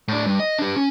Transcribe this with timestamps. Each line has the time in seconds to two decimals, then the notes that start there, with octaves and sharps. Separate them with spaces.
0.08 A2 D4
0.26 G2
0.40 D#5
0.59 D4 G4
0.76 C#4